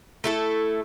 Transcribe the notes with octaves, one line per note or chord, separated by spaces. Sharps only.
A3 E4 A4